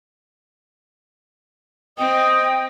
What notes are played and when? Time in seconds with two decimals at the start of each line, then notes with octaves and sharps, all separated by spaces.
1.98 C4 D#5 G5 D#6